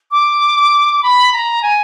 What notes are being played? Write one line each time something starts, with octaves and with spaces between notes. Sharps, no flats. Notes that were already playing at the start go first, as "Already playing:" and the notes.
D6
B5
A#5
G#5